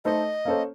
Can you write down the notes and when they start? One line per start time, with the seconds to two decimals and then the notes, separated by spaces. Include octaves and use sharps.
0.05 A3 D#4 A4 C5 D#5
0.45 A#3 C#4 A4 C5